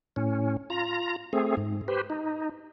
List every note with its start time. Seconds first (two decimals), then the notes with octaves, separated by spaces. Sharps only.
0.16 A2 C#4
0.70 F4 A#5
1.33 A3 C4 G#4
1.57 G#2
1.88 G4 B4 C5
2.10 D#4